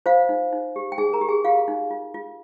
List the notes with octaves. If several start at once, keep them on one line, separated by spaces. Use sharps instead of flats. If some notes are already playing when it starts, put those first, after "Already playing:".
F4 C5 F5
D#4
D#4
G4
G5
D#4 G#4 G#5
A#4 A#5
G4
G#4 G#5
F4 G4 F5
D#4
F4
F4